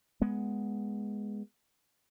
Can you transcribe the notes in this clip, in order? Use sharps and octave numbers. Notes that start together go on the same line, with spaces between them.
G#3 B3